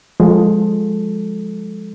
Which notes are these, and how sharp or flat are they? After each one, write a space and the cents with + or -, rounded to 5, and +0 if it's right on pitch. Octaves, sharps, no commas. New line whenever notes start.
F3 +25 G#3 +0 A4 +0